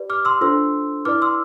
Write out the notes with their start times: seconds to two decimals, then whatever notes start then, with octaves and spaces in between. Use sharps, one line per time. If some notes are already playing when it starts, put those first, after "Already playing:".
Already playing: G4 B4 D5
0.10 D6 F6
0.25 C6 E6
0.41 D4 F4 A4 C5 C6 E6
1.05 E4 B4 D5 D6 F6
1.22 C6 E6